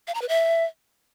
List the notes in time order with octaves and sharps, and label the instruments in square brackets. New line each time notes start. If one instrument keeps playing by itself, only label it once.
[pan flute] F5
A#5
B4
E5